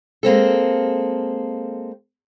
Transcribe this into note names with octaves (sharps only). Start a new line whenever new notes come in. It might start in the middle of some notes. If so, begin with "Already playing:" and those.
G#3 A#3 C4 A4